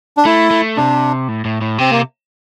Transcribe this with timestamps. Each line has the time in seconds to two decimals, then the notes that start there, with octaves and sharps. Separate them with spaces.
0.17 D4
0.25 A3 E4
0.51 A3
0.77 C3 D4
1.28 A2
1.45 A2
1.61 A2
1.78 C3 C4
1.91 A#3